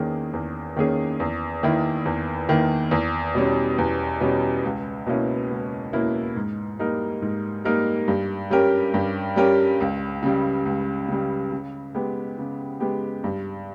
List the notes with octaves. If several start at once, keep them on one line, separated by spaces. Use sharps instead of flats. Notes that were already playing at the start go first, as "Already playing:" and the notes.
Already playing: E2 D#3 A#3 C#4 G#4
E2
D#3 A#3 C#4 G#4
E2
D#3 A#3 E4
E2
D#3 A#3 E4
E2
B2 G3 C#4
E2
B2 G3 C#4
C#2
B2 A#3 C#4 E4
C#2
B2 A#3 C#4 E4
G#2
G3 A#3 D#4 A#4
G#2
G3 A#3 D#4 A#4
G2
G3 C#4 G4 A#4
G2
G3 C#4 G4 A#4
C#2
C#3 G3
C#2
C#3 G3
C#3
G#3 B3 G4
C#3
G#3 B3 G4
G2